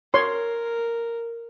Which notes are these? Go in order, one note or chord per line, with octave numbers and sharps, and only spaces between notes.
A#4 C#5 C6